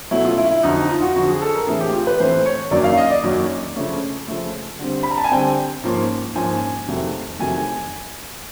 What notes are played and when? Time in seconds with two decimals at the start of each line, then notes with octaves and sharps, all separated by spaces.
0.11 B2 F#3 A3 C#4 E4
0.25 F4
0.38 E4
0.51 E4
0.63 F2 D3 F#3 D#4
0.77 D#4
0.90 F4
1.02 F#4
1.16 F2 D3 F#3 F#4
1.28 G#4
1.42 A4
1.55 A#4
1.67 A2 E3 A3 C4 G#4
1.81 G4
1.93 F4
2.07 B4
2.20 A2 E3 A3 C4 C5
2.46 C#5
2.71 F#2 D#3 F#3 A#3 C#4 D5
2.84 F5
2.98 D#5
3.10 D5
3.24 F#2 D#3 F#3 A#3 C#4
3.76 C#3 F3 A3 C#4
4.27 C#3 F3 A3 C#4
4.79 D3 G3 C4
5.03 B5
5.11 A#5
5.18 A5
5.24 G#5
5.31 D3 G3 C4 G5
5.83 G#2 F3 A#3 C#4
6.35 G#2 F3 A#3 C#4 G#5
6.88 F2 C3 D#3 F#3 A3
7.39 F2 C3 D#3 F#3 A3 G#5